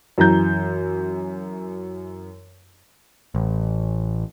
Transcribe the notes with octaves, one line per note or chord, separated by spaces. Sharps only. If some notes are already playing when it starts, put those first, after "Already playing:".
F#2 E3 A#5 G6
A1